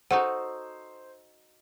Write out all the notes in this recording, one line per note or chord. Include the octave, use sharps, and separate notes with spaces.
D#4 F#4 A4 C5 F#5